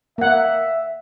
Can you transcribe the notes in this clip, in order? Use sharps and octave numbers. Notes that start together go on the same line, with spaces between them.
A#3 E5 F#5